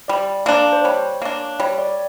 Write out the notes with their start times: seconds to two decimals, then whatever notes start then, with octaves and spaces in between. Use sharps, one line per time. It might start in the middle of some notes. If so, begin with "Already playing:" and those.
0.08 G3 D5
0.46 A#3 D4
0.73 C5
0.84 G3 C#5
1.22 A#3 D4
1.60 G3 C#5
1.78 D5